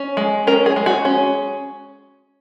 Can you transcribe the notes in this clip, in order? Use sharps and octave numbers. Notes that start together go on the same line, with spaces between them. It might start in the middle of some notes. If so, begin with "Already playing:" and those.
Already playing: C#4
G#3
C#4 A#4
G#4
G#3
F#4
C#4